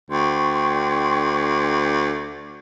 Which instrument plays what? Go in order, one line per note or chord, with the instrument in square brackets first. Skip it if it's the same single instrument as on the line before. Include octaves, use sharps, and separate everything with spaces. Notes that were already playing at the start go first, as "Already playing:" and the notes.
[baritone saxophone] D2 [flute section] G5 C6 C#6